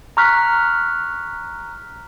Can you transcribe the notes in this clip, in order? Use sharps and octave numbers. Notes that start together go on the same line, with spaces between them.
A#5 C#6 F6 F#6 B6